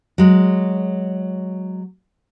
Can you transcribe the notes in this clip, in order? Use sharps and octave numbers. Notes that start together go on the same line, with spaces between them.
F#3 G#3